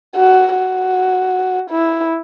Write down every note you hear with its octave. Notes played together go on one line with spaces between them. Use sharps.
F#4
F#4
E4